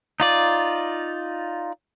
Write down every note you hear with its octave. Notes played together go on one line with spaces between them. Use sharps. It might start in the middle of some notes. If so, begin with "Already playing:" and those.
D#4 F4 D5